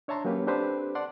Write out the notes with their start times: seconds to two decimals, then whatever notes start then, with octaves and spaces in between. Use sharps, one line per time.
0.08 D4 C#5 E5 A5 A#5 C6
0.25 F#3 A#3 C#4 G4 B4
0.47 C4 D4 G4 A4 B4 C5
0.95 D5 F#5 A5 C6